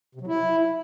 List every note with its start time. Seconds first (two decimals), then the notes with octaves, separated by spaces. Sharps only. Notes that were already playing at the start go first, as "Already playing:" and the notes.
0.15 C3
0.21 F#3
0.27 E4